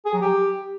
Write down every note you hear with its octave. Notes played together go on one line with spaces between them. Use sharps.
G#4
F#3
G4